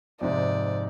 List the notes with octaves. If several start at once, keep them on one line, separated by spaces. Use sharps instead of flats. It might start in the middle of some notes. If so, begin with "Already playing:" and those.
F2 G#2 C3 D5